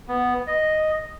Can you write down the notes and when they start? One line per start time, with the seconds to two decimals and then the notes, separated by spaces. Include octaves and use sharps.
0.08 B3
0.47 D#5